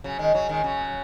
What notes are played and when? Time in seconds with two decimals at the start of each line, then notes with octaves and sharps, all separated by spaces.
0.04 C#3 F#3
0.19 D#3 G#3
0.33 C#3 F#3
0.49 D#3 G#3
0.64 C#3 F#3